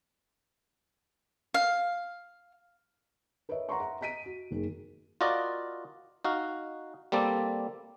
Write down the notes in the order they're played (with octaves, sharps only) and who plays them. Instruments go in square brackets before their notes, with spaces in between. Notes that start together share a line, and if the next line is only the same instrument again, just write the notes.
[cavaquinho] F5
[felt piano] A#4 B4 C#5 D#5 E5
F#5 A#5 C6 C#6
E5 F#5 A#5
D#5 A#5 B6 D7 D#7
F#4
F#1 D#3 G#4
[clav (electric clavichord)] F4 F#4 A#4 D5 D#5
D#4 F#4 F5
G3 A#3 C4 A4 D5